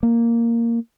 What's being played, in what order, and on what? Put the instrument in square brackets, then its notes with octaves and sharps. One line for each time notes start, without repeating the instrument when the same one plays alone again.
[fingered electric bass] A#3